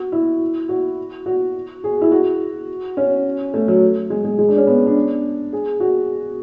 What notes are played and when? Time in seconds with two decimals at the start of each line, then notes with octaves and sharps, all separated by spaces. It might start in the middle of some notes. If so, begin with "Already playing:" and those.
Already playing: F#4
0.12 E4
0.69 F#4
1.26 F#4
1.84 G#4
2.01 E4
2.12 F#4
2.97 C#4
3.54 A3
3.68 F#3
4.10 G#3
4.25 G#3
4.39 G#3
4.49 D4
4.57 C#4
4.67 B3
4.86 D4
5.53 G#4
5.80 F#4